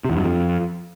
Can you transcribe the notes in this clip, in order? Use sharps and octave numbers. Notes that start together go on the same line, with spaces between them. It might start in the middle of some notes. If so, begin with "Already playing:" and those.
C3
E2
G2
F#2
F2